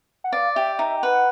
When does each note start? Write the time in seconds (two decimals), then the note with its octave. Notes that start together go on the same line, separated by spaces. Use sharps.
0.24 F#5
0.32 D5 F5
0.55 G4 E5
0.79 D#4 E5
0.96 G5
1.03 B4 F#5